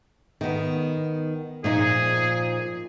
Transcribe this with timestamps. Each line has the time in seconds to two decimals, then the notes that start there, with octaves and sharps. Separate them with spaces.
0.41 D#3 B3
1.64 A#2 F3 D#4 G#4